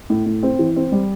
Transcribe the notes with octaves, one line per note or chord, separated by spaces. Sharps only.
A2
A2
C4
E3
C4
G3